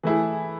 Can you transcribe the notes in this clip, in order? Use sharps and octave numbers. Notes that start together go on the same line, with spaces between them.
E3 A3 E4 G#4